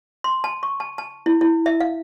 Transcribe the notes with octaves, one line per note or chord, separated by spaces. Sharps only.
C6
A5
C#6
A5
A5
E4
E4
E5
F5